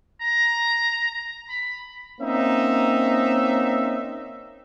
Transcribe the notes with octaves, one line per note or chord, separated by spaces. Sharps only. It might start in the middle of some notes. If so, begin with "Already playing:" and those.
A#5
B5
A#3 C4 C#4 D#4 E5